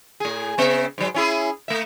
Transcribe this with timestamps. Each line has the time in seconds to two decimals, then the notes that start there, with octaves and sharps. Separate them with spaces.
0.20 A2 G#4
0.58 C#3 B3 E5
0.98 G#2 F#3
1.14 C#4 E4 G#4
1.68 A3 E5